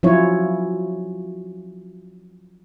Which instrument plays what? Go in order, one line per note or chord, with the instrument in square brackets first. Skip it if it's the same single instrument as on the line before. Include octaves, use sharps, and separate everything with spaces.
[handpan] F3 F#3 C#4 E4 F4 C#5